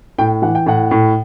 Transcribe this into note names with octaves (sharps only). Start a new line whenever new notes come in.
A2 G5
E3 F#5
G5
A2 F#5
A2